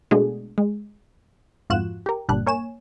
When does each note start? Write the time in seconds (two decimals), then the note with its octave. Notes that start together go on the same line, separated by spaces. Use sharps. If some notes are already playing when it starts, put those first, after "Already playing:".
0.11 B2 G#3 A3 D4 F#4 G#4
0.58 G#3
1.70 F2 G#2 F4 F#4 F#6 E7
2.06 G4 A#4
2.28 G1 A#2 G3 D4 F#6
2.46 A#3 C#5 G#5 E7